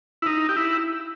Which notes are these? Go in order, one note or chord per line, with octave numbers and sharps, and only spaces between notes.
E4
D#4
G4
E4